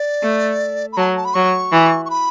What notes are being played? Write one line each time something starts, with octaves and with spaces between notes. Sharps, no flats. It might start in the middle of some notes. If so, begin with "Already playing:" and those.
Already playing: D5
A3
B5
F#3 A5
A5
B5
F#3 C#6
E3
C#6
B5